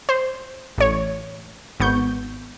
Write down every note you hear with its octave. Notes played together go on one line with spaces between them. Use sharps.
C5
A1 C#5
G#1 B3 C#6 G6